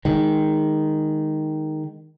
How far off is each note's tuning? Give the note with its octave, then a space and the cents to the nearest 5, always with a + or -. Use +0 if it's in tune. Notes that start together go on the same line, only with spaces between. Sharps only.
D#3 +0 G#3 -10